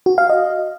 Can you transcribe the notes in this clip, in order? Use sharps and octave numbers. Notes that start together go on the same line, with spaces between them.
F#4
F5
D#5